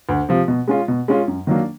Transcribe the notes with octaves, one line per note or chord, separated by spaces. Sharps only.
D2
C3 F3
B2
G#3 C#4 F4
B2
G#3 C#4 F4
F#2
D#3 F#3 A#3 D4